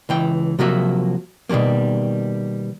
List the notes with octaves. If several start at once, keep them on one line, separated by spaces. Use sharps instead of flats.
C#2 E3 G5
C3 F3 F#3 A#3 F#4 E5
B2 D#3 G3 A3 A#3